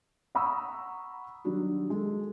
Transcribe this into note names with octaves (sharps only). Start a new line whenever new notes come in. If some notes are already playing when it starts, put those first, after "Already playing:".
F#5 A#5 B5 C#6 D#6 E6
D#3 F#3 G3 D4 F#4
G#3 A4